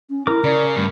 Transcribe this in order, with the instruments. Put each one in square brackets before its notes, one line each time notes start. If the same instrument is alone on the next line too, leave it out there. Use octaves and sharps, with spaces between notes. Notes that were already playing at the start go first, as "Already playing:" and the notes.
[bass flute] C#4
[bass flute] E4 [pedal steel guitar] A#4 D6
[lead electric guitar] C#3 [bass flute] D5
[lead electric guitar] G2 [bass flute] A3